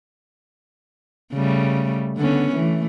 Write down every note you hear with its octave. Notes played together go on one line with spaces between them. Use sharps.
C#3 G3 A3
D3 B3 C#4
E3 A3